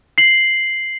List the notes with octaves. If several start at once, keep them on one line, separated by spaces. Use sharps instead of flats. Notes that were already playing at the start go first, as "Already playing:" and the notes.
C7 F#7